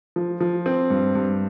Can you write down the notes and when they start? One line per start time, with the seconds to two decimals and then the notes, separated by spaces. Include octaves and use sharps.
0.16 F3
0.40 F3
0.66 C4
0.90 G2
1.15 G2